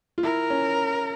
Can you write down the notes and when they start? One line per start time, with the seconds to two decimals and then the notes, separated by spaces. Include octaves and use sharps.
0.18 F4
0.23 E4 A#4
0.50 C#4